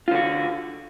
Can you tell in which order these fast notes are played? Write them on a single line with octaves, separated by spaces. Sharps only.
F4 D3 F#4